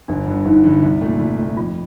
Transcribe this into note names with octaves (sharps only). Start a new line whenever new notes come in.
G1 D4
G2 D3
G1 D#4
G2 D3
C2 D#4
A#2 A3
C2
A#2 A3
F2 F4